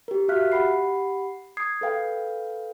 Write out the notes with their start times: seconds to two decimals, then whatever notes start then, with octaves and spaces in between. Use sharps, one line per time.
0.08 G4 A#4
0.28 F#4 E5 F5 F6 F#6 B6
0.52 G4 F#5 B5 C7
1.57 D#6 G#6 C7
1.81 A4 B4 F5 G5